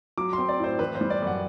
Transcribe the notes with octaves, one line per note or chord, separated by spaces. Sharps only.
F#3 D6
C6
C4
D5
A2 C5
E3 B4
C5
G3
D5
F#2 F#5